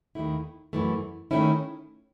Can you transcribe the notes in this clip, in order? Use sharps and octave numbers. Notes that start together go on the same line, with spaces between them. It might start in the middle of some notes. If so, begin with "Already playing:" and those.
D#2 D#3 A3 E4
F#2 E3 A3
D#3 A3 C#4 E4